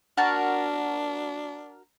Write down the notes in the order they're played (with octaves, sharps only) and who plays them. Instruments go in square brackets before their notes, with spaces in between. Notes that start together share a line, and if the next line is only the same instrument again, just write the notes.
[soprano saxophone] D4 [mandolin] F#4 A#4 A5